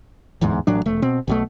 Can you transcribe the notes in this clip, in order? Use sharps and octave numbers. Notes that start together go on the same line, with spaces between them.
D1 E2 G#2 G#3
A1 A2 F#3 D4
E1 A3
B2 C4
B1 B2 A3